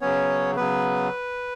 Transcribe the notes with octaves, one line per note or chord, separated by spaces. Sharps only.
C#3 F#3 B3 C#4 C#5
C#3 F#3 B3 B4